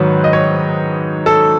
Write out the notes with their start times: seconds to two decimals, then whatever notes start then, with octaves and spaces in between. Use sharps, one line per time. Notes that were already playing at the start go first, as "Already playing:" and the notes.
Already playing: G#2 D#3 F#3 B4
0.24 D#5
0.33 C#5
1.26 A4